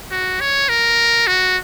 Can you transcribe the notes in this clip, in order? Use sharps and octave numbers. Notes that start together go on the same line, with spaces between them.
F#4
C#5
A#4
F#4